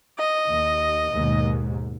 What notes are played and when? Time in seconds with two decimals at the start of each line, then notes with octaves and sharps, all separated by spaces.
0.19 D#5
0.52 D#2
1.13 D#2 G#2 B2